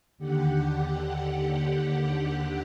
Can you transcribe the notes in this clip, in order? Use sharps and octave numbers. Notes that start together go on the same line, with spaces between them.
D#2 D3 G4 F#5